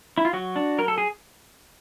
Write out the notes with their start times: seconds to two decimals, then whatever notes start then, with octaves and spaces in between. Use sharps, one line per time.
0.18 E4
0.25 F4
0.33 F#3 F#4
0.56 D4
0.78 F#3 A#4
0.88 A4
0.98 G#4